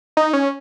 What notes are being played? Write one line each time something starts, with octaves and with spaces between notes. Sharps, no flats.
D#4
C#4